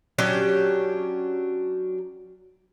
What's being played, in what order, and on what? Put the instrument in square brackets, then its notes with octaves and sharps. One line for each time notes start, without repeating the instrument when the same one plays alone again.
[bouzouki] F#3 C#4 D4 G4